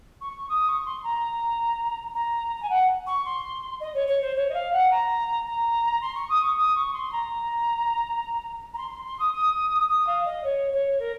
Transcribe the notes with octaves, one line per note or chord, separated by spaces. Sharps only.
C#6
D#6
C#6
C6
A#5
A#5
A#5
G#5
F#5
C#6
C6
D#5
C#5
C#5
C5
C#5
D#5
F5
F#5
A#5
A#5
C6
C#6
D#6
C#6
D#6
C#6
C6
A#5
A#5
C6
C6
C6
D#6
D#6
D#6
F5
D#5
C#5
C#5
A#4